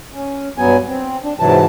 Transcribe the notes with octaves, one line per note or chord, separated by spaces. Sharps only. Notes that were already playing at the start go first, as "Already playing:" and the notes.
C#4
G2 F#3 B3 G#5
C4
D4
G#2 C3 E3 F#3 A5